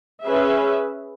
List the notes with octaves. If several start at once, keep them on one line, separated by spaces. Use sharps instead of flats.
C#4 G#4 B4 E5